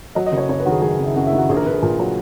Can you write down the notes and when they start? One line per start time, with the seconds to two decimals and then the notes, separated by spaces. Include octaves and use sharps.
0.15 F#3 D#5
0.26 D#5
0.32 F#1
0.38 C#5
0.49 F#2 C#5
0.60 B4
0.66 D#3 F#4
0.72 G#4
0.82 F#3 G#4
0.99 F#1
1.06 E4
1.16 F#2 F#4
1.27 E4
1.33 D#3
1.38 F#4
1.49 A#1 G#4
1.57 A#4
1.66 A#1 B4
1.74 G#4
1.83 A#2
1.99 F#3